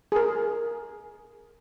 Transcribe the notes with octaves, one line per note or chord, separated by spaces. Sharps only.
G#4 A#4